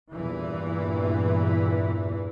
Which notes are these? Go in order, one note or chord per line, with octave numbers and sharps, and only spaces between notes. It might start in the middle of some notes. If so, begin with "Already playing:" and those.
E2 G2 A#2 E3